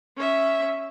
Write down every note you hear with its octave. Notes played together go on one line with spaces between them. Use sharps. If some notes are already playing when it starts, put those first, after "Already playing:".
C#4 E5